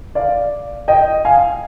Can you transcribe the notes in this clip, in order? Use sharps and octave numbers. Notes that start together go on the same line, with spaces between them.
D5 F5
D#5 G5
F5 G#5